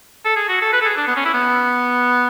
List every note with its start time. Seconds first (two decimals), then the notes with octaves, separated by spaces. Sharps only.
0.25 A4
0.36 G#4
0.49 F#4
0.62 A4
0.73 B4
0.82 A4
0.85 G#4
0.97 D4
1.07 B3
1.16 C#4
1.26 E4
1.34 B3